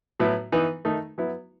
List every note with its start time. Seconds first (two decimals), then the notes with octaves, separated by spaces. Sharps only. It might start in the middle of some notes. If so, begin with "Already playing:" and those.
0.20 A2 F#3 B3 E4
0.52 E3 B3 D#4
0.85 D#3 A3 D#4
1.18 F#3 B3 E4